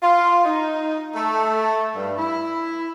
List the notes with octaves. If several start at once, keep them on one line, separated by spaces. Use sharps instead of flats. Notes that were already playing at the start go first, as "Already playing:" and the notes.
F4
D#4
A3
G2
E4